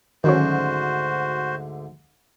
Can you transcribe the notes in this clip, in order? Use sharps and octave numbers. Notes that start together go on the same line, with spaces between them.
D2 G#2 D3 D#3 F#3 C#4 F#4 C5